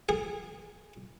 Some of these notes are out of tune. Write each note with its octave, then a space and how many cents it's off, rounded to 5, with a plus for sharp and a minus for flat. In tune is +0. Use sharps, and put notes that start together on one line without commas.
G#4 -20